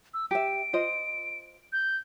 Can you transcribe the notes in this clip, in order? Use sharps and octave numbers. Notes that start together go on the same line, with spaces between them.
E6
G4 E5 D7
F4 C5 D#5
G6